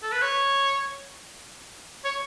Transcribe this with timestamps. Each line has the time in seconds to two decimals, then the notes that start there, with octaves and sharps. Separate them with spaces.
0.03 A4
0.12 B4
0.22 C#5
2.04 C#5